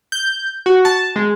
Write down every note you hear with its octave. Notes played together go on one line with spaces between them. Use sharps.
G6
F#4
A5
G#3